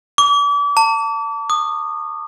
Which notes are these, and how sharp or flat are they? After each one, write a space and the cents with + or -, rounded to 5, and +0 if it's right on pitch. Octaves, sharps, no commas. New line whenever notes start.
D6 -35
A5 +30
D#6 -25